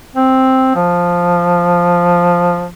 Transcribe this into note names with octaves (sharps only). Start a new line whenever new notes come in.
C4
F3